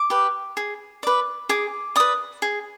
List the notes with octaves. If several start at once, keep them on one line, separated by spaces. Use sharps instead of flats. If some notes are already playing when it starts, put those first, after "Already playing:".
Already playing: D6
G4 B4
G#4
B4 D5
G#4 D6
B4 D5 D#6
G#4